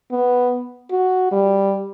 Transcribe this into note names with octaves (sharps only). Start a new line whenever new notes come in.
B3
F#4
G3